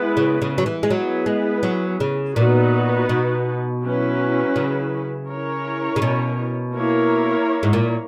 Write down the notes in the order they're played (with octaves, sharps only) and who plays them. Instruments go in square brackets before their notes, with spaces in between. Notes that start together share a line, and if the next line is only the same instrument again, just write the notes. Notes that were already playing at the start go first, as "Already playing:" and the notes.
Already playing: [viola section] G#3 B3 E4 B4
[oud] C#3
C#3
F#3
E3
G#3
[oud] F#3 [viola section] B3 E4 G#4 B4
[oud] G#3
F#3
C#3
[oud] A#2 [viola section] B3 D#4 F#4 B4
[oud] B2
[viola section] F#3 C#4 E4 B4
[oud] C#3
[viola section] C#4 E4 A#4 C#5
[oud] C#3
B2
[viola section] A#3 E4 A#4 C#5
[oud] G#2
A#2